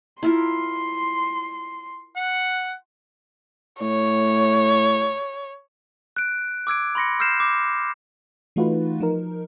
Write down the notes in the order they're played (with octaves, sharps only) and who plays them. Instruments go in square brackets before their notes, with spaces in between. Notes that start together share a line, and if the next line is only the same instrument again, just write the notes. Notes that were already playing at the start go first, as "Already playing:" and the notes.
[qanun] E4 F4 A#4 [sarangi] C6
[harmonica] F#5
[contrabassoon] A2 [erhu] C#5
[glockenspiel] F#6 D7
D6 E6 G#6 D7
B5 C6 A#6 C#7
E6 F6 G6 C7 E7
D6
[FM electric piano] E3 A3 D#4 F4 F#4 B4
F3 D#4 A#4